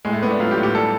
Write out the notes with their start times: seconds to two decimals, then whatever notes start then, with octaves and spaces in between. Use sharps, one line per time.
0.05 A2 G#3
0.13 A3
0.22 A2 B3
0.31 D4
0.40 F#3 F4
0.51 G4
0.57 A2
0.63 G4
0.75 G3 A4